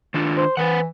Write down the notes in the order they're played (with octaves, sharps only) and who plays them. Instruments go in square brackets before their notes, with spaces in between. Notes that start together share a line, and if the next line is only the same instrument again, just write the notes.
[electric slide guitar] D#3 D4 F4
[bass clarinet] C5
[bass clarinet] E3 [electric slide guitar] B4 C5 F#5